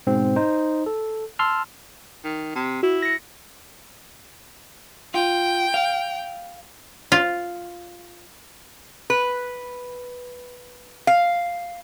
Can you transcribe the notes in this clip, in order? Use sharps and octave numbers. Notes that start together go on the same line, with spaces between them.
G#2 B2 C4
D#4 C5
A4
A5 C6 E6 F6
D#3
C3
E4 F#4
A#6 C#7
F4 G5
F5
F4
B4
F5